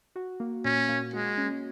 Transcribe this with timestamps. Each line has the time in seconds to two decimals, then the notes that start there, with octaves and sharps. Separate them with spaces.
0.16 F#4
0.40 A#3
0.65 A#2 C#4
0.89 A#3
1.13 G#3 F#4
1.38 C#4